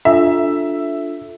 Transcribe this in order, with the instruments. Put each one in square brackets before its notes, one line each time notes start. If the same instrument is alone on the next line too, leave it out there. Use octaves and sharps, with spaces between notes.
[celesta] D4 F4 A4 [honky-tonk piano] E5